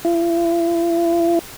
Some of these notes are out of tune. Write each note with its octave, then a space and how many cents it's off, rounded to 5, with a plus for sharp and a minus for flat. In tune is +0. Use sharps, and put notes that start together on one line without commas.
E4 +45